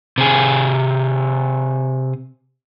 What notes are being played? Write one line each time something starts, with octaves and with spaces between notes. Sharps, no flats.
C3 G#4